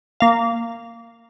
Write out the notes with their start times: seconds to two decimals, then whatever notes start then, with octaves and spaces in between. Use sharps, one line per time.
0.20 A#3 F5